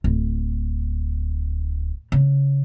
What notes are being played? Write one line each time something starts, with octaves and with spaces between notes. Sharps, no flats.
D1
C#3